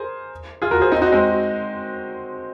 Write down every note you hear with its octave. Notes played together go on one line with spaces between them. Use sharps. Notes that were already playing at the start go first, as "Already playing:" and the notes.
Already playing: G#4 A#4 C5
F4 G#4
F#4 A#4
G#4 C5
C4 D#4
D#4 F#4
G#3 C4
F#4